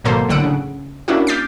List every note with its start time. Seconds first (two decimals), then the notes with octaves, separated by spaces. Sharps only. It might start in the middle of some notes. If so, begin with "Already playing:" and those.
0.04 G#1 B2 F#3 A#3 A4 C5
0.29 B1 A2 D3 F#5 E6 D7
0.44 C#3
1.08 A#3 C#4 D4 E4 F#4
1.27 D6 F6 G6 A6 B6 C7